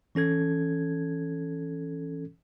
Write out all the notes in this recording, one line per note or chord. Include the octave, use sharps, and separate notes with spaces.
E3 C#4 A4 G#6